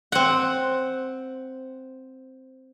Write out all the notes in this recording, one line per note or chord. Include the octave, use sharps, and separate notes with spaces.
C4 F#5